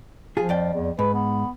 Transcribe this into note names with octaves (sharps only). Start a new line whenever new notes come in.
F3 F4 G#4
F2 D5 G5
E2
G#2 B4
B3